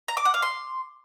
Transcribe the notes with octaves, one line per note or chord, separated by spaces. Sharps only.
A#5
D6
F#5
F5
C6